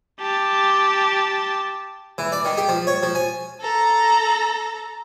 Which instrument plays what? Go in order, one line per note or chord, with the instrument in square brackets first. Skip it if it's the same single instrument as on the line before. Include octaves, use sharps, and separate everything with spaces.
[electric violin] G4 A5
[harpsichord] E3
D5
D#3
G4
F3
C#5
F3
G#5
[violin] A4 A#5